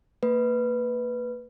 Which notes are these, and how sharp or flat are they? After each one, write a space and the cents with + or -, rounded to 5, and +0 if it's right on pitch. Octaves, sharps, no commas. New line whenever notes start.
A#3 -30 B4 +0